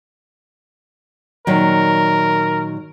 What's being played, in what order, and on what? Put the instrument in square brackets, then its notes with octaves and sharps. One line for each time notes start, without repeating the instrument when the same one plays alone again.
[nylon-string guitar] A#2 D#3 F#3 [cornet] A#4